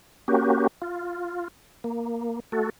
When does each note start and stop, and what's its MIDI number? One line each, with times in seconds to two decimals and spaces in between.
0.28 0.67 58
0.28 0.67 61
0.28 0.67 66
0.28 0.67 67
0.82 1.48 65
1.84 2.40 58
2.52 2.70 57
2.52 2.70 66
2.52 2.70 69